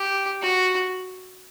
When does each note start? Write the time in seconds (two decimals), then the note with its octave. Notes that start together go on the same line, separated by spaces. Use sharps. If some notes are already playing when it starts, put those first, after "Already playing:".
Already playing: G4
0.42 F#4